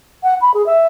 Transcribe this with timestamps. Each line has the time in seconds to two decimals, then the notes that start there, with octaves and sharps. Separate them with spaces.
0.23 F#5
0.41 B5
0.54 G#4
0.66 E5